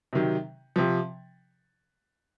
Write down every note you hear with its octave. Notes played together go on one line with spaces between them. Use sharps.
C3 D#3 F#3
C3 F3